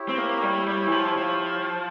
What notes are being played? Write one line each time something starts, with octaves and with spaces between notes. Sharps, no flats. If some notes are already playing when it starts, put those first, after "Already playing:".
Already playing: E4 G4 C#5
C4
A#3
G3
G3
E3
F3
F3